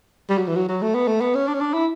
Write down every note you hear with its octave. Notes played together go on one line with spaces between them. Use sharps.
G3
F#3
E3
F#3
F#3
A3
B3
A3
B3
C#4
D4
C#4
D4
E4